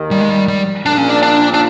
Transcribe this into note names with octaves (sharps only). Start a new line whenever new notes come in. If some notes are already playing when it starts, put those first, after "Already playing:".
Already playing: D#2 D#3
G3
G#3
G3
G3
A#1 A#2 D4
C#4
D4
D4
D4